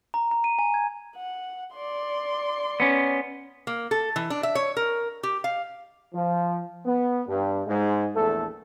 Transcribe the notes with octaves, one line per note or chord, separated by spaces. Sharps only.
A#5
A#5
D#7
G#5
G#6
F#5
D5 C6
B3 C#4
A#3
A4
E3
D4
E5
C#5
A#4
G4
F5
F3
B3
G2
G#2 G#3
A#1 E2 A3 A4